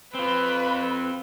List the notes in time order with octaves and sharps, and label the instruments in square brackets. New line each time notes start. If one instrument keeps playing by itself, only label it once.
[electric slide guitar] C4 F4 [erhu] B4